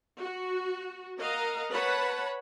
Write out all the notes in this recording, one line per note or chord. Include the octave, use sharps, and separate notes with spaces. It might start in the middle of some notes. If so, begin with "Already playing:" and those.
F#4
A#4 D#5 F5 F#5 A#5
B4 C#5 F#5 A5 B5